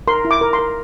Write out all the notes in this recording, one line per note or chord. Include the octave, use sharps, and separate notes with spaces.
A#4 C6
E4
D6
A#4
C6
A#4